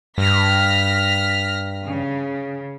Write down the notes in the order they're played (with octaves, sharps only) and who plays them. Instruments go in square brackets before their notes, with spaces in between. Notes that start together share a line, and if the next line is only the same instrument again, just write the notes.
[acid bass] G2 [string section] F6 A#6 B6
[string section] C#3